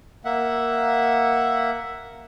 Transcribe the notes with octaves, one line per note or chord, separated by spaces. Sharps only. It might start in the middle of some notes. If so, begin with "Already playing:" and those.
A#3 E5 F#5